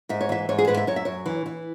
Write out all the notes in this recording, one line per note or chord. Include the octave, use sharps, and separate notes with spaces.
G#2 E5
C#5
E3 E5
G#2 C#5
G#4
G#2 B4
E5
F#2 C#5
E5
F#2 C#5
E3
E3